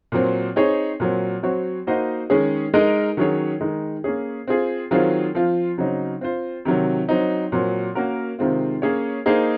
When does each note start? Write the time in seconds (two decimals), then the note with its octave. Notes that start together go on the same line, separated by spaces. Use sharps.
0.12 A#2 F#3 C4
0.56 C4 D#4 G#4 C#5
1.00 A#2 F#3 C4
1.43 F#3 C4 F#4 C#5
1.87 A#3 D#4 F#4 C5 D#5
2.30 D#3 G#3 C#4 G#4
2.74 G#3 D#4 A#4 D#5
3.17 D#3 F#3 C#4 G#4 C#5
3.61 D#3 G#3 D#4
4.04 A#3 C#4 G#4
4.47 C4 F4 G#4
4.91 D#3 F#3 C4 F4 G#4
5.35 F3 C4 F4
5.78 C#3 F#3 C4 D#4
6.21 C4 F4 C5
6.65 C3 D#3 F#3
7.09 F#3 C4 D#4
7.52 A#2 F#3 C4
7.95 A#3 C#4 F#4 A#4
8.39 C3 D#3 G#3 C4 F4
8.82 A#3 C#4 G#4 C#5
9.26 A#3 D#4 G#4 C5